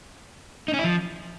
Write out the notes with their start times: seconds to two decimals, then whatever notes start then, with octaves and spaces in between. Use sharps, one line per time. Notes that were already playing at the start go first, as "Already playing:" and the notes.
0.68 D#4
0.74 C#4
0.79 E4
0.84 F3